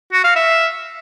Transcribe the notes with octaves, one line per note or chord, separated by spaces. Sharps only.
F#4
F5
E5